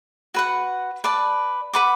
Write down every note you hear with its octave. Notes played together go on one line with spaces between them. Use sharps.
F#4 B4 F#5
B4 D5 A5
B4 F#5 B5 D6